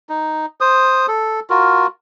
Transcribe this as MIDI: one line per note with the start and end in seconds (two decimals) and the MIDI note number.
0.09 0.46 63
0.61 1.06 72
0.61 1.06 87
1.08 1.40 69
1.50 1.87 65
1.50 1.87 66
1.50 1.87 70